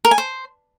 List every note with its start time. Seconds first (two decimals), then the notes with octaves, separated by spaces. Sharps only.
0.05 A#4
0.11 G#5
0.18 C5